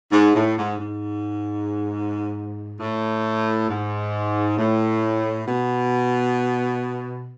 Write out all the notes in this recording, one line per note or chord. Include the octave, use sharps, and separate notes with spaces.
G#2
A2
G#2
G#2
A2
G#2
A2
B2